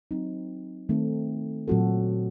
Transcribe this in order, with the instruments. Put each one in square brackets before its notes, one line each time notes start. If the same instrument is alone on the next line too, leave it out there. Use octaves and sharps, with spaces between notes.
[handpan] F#3 C4 D#4
D#3 A3 C4 D#4 A4
A#2 F#3 C4 F#4 A4